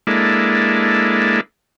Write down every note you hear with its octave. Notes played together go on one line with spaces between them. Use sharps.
G#3 A#3 D4 E4 A4